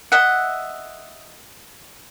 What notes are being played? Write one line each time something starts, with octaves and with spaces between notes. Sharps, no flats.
D#5 E5 F#5